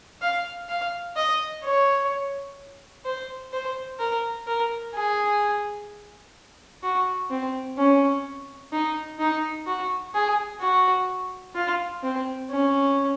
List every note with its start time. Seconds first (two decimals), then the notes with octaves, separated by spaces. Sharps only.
0.22 F5
0.69 F5
1.16 D#5
1.64 C#5
3.05 C5
3.53 C5
3.99 A#4
4.47 A#4
4.94 G#4
6.83 F#4
7.30 C4
7.78 C#4
8.72 D#4
9.19 D#4
9.67 F#4
10.14 G#4
10.61 F#4
11.55 F4
12.03 C4
12.50 C#4